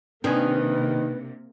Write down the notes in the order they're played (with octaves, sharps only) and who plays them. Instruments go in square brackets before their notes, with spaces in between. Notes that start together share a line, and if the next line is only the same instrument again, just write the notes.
[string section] C3 A#3 [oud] D#3 [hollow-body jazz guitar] C4 D4 G#5 [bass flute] B4